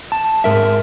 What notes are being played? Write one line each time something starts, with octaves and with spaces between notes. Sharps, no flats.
A5
G#2 A#4 E5